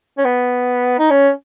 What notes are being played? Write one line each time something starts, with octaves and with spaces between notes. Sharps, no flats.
C#4
B3
D#4
C#4